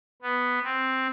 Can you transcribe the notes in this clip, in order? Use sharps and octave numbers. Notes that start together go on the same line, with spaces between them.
B3
C4